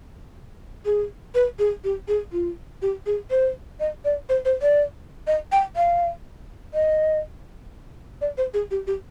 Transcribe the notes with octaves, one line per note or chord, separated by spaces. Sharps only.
G#4
B4
G#4
G4
G#4
F4
G4
G#4
C5
D#5
D5
C5
C5
D5
D#5
G5
F5
D#5
D5
C5
G#4
G4
G4